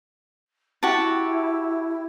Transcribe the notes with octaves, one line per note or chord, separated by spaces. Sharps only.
E4 F#4 G4 A5